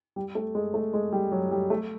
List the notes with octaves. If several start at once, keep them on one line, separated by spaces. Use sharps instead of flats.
G3
A3
G#3
A3
G#3
G3
F#3
G3
A3